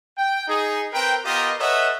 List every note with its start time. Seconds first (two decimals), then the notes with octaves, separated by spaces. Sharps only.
0.18 G5
0.48 D#4 G#4
0.93 C4 A#4 B4 G5
1.25 B3 F4 G4 A#4 D#5
1.59 A4 B4 C#5 D#5 E5 F#5